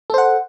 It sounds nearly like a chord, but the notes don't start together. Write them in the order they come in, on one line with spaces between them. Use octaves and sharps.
A4 C5 F#5